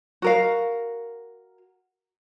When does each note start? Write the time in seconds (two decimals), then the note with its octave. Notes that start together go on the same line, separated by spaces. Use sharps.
0.22 F#4 A#4 F5